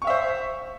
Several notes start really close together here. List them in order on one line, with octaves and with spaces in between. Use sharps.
C#6 F5 E5 C5